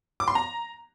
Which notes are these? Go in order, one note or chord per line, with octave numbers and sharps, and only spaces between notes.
D6
C6
A#5